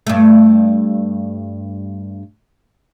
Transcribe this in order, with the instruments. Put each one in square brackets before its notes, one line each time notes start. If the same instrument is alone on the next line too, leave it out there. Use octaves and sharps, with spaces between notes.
[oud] G2 A3